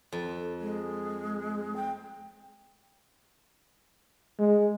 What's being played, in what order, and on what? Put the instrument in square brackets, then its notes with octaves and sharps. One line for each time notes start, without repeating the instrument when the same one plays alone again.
[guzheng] F2
[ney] G#3
G5
[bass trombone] G#3